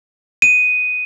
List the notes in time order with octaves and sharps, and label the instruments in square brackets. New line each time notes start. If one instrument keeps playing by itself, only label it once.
[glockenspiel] D#7